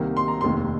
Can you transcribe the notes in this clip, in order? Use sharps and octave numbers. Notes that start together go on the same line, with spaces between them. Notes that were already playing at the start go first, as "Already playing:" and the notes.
Already playing: C2 C3 D#3 A#3
C6
A#5
F1 D#2 D#3 C6